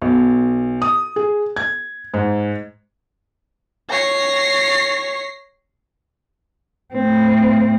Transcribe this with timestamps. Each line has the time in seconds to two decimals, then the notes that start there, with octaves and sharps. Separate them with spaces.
0.02 B1
0.82 D#6
1.16 G#4
1.56 G#6
2.14 G#2
3.90 C#5 A#6 C7
6.94 A2 C4